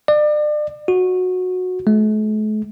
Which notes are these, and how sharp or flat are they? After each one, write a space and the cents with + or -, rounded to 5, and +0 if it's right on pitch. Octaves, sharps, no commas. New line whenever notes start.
D5 +35
F#4 -15
A3 -45